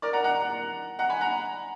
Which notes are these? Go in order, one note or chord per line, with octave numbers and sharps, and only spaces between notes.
A#4 D5
F#5 A#5
F#5 A#5
F#5 A#5
G#5 B5
F#5 A#5